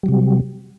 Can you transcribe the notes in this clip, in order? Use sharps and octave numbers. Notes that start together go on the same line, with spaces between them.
C3 F#3 G3